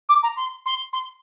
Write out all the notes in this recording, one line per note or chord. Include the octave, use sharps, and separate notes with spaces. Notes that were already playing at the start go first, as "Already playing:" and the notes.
D6
A#5
C6
C6
C6